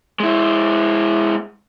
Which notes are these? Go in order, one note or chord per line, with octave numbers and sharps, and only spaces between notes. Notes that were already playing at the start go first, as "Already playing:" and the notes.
G#3 E4